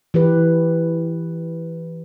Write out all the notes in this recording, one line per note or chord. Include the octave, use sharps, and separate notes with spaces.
E3 G4 B4